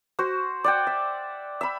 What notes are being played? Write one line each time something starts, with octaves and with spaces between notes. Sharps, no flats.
F#4 C5
D5 F#5 G5
E5
E5 B5